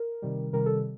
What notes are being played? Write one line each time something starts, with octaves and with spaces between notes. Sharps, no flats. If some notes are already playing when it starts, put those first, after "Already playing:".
Already playing: A#4
C3 D#3 G3
C3 D#3 G3 A#4
A4